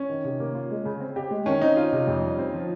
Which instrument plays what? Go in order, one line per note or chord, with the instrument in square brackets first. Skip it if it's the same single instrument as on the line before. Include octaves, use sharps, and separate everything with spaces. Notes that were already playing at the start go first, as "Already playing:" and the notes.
Already playing: [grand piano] C#4
[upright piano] D#3
C3
A#3
F4
G#3
C#3
C4
G4
G#3
[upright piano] D#3 [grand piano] C#4
[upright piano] C4 [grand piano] D#4
[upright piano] D#4 [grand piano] F4
[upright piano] C3
F2
G3
C4
F3